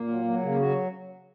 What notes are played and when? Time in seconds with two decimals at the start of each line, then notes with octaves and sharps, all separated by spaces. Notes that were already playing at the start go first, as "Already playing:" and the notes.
Already playing: A#2 A#3
0.08 F#3
0.24 F#3
0.41 C#3 A#3
0.58 F#3 F#4